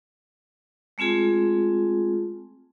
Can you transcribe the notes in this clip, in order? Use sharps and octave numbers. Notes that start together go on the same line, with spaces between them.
G#3 A3 C4 F4 G#4